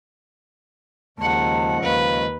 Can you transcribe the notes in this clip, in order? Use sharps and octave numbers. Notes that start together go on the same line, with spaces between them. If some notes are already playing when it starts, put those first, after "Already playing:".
D#2 C#3 F3 G#3 F#5 A5
D#2 B4 F5